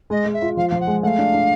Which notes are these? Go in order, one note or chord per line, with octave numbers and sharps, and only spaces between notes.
G#3 D#5
G#3
E5
F4
F3 F5
F3 F5
F#5
G#3
A3 F5 F#5
D4
D4